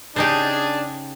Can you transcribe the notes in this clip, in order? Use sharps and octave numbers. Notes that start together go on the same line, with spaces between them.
C#3 D4 D#4 G4 G#4 A5